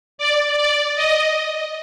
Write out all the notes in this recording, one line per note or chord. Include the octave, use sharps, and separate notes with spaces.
D5
D5
D#5